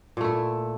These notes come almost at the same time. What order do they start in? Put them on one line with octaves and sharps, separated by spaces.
A#2 A3 E4